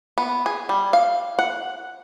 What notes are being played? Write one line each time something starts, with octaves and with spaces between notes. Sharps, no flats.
B3
G#4
G3
F5
F#5